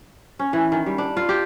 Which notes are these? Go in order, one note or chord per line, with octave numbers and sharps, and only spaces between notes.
C#4
E3
D#3
G3
D4
F4
G4